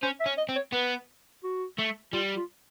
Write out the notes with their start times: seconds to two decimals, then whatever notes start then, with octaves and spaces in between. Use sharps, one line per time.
0.02 C#4 C5
0.20 E5
0.26 C#4
0.37 D#5
0.49 C4
0.56 C#5
0.73 B3 B4
1.43 F#4
1.78 A3
2.13 G3 F4
2.36 F4